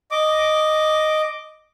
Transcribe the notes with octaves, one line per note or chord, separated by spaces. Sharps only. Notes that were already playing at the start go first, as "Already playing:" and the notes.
D#5 D6